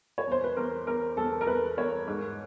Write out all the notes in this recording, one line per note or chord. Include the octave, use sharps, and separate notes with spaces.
C#5
E2 C5
B4
E2 A#4
E2 A#4
E2 A4
A#4
E2 B4
E2 C#5
G#2